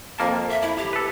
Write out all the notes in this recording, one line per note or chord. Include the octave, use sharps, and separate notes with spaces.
F2 A#3 A#4 A5
E5
E4
G4
A4 B4